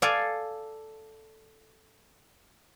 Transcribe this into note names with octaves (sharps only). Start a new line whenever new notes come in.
A4 D5 F5 G#5